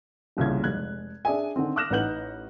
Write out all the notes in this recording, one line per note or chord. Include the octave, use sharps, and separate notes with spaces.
D#1 C2 A#2 C#3 G#6
F1 G#3 F#6 G#6
D4 G#4 D5 E5 G#5
D3 D#3 C4
D6 D#6 F6 F#6 A#6 E7
A1 D#4 B4 F#5 G6 F#7